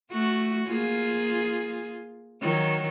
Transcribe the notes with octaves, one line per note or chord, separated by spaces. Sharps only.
A3 F#4
A#3 F4 G#4
D#3 F#3